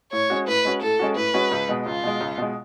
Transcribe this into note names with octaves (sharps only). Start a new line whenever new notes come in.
A2 C#5
G#3 C#4 F#4
A2 B4
G#3 C#4 F#4
A2 A4
G#3 C#4 F#4
A2 B4
G#3 C#4 F#4
C#2
B2 G#3
C#2 F4
B2 G#3
C#2
B2 G#3